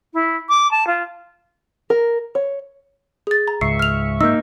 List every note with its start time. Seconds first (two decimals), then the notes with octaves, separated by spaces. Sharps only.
0.13 E4
0.49 D6
0.71 A5
0.86 F4
1.90 A#4
2.35 C#5
3.27 G#4 A6
3.48 A#5
3.61 C#2 G#2 E5 C#6 C7
3.79 F6 F7
4.21 A#3 D#4 E6 G6